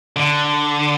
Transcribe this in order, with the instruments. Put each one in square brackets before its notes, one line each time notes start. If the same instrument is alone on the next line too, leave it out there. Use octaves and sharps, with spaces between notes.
[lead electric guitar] D3